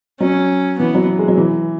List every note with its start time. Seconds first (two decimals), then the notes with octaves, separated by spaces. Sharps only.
0.20 F#3 C#4
0.79 E3 B3
0.95 F#3
1.19 G#3
1.28 F#3
1.37 E3